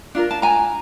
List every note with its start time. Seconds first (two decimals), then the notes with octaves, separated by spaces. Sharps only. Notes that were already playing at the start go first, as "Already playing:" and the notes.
0.15 D4 F4 A#4
0.31 A5
0.42 G#5 A#5